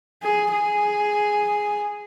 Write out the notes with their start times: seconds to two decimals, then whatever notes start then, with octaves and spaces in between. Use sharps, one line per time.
0.23 G#4
0.51 G#4